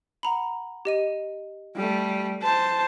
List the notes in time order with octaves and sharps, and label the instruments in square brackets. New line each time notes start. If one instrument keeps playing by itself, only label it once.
[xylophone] F#5 A#5 B5
G4 D#5 D#7
[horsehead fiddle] G3 A3
C5 A5